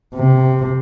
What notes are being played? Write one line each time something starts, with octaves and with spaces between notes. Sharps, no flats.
C3